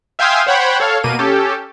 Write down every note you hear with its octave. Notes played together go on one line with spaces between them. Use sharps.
E5 F5 G5 G#5 C6 D#6
C5 C#5 F#5 G5 B5
A4 C#5 F5
B2 A#3 D#7
C#4 G4 A4